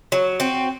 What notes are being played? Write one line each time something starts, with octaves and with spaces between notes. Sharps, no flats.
F#3
C4 F#4